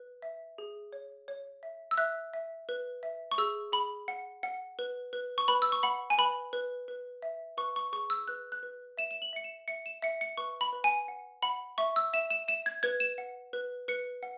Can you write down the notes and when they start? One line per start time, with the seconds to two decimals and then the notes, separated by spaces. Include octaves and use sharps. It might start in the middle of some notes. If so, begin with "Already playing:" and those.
Already playing: B4
0.22 E5
0.58 G#4
0.93 C#5
1.28 C#5
1.63 E5
1.91 E6
1.97 E5 F#6
2.34 E5
2.69 B4
3.03 E5
3.31 C#6
3.38 G#4 E6
3.72 G#4 B5
4.08 F#5
4.43 F#5
4.79 B4
5.13 B4
5.38 C#6
5.48 B4 B5
5.62 E6
5.72 C#6
5.83 F#5 B5
6.10 G#5
6.18 B4 B5
6.53 B4
6.88 B4
7.22 E5
7.57 B4 C#6
7.76 C#6
7.92 G#4 C#6
8.10 E6
8.28 B4 F#6
8.52 F#6
8.63 B4
8.98 E5 E7
9.11 E7
9.22 F#7
9.33 E5 C#7
9.44 E7
9.68 E5 C#7
9.86 E7
10.03 E5 C#7
10.21 C#7
10.38 B4 C#6
10.61 B5
10.73 B4
10.84 G#5
11.08 F#5
11.43 F#5 B5
11.78 E5 C#6
11.96 E6
12.13 E5 E7
12.30 E7
12.48 E5 E7
12.66 G#6
12.83 B4 G#6
13.00 E7
13.18 F#5
13.53 B4
13.88 B4 C#7
14.23 F#5